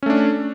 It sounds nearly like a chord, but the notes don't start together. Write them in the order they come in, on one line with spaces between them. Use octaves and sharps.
C#4 A3 D4